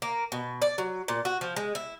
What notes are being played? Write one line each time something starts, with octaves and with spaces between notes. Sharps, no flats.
A#3
B2
D5
F#3
A#2
F#4
F3
G#3
E4